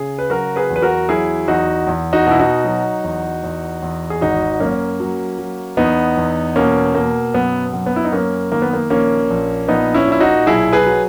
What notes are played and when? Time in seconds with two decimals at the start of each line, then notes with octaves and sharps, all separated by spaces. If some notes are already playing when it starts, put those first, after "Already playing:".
Already playing: C#3 G#4
0.19 B4
0.30 F#3 F#4 A#4
0.56 G#4 B4
0.70 E2
0.76 B4
0.82 F#4 A#4
1.09 F#3 E4 G#4
1.48 E2 D#4 F#4
1.87 E2
2.13 D#4 F#4
2.26 B2 E4
2.40 D#4 F#4
2.65 F#3
3.04 E2
3.44 E2
3.82 E2
4.10 G#4
4.21 G#1 D#4 F#4
4.60 F#2 A#3 C#4
5.00 F#3
5.39 F#3
5.77 E2 B3 D#4
6.18 E2
6.56 B2 A#3 C#4
6.95 B2 A#3
7.34 F#2 B3
7.74 F#2
7.86 B3
7.96 E4
8.05 D#4
8.12 F#2 A#3 C#4
8.52 D#3 A#3
8.62 B3
8.73 A#3
8.90 A#1 A#3 C#4
9.30 A#1
9.68 A#1 B3 D#4
9.94 C#4 E4
10.07 A#2 E4
10.20 D#4 F#4
10.47 B1 E4 G#4
10.73 G#4 B4
10.86 F#3